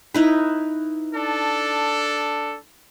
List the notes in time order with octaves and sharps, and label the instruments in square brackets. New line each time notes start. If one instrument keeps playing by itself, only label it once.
[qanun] D#4 E4 B4
[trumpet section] D4 A4